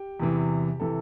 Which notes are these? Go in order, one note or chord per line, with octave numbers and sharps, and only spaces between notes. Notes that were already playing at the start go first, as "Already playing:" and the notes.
Already playing: G4
E2 C3 E3
C3 E3 A4